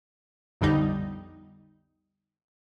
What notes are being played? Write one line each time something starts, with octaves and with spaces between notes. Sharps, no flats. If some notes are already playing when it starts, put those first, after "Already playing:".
B1 F2 D3 G3 D#4